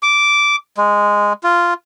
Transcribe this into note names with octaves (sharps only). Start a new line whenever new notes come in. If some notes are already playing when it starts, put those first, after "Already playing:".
D6
G#3
F4